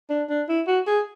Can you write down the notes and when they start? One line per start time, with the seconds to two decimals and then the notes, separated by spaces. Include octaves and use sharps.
0.10 D4
0.29 D4
0.48 E4
0.67 F#4
0.87 G#4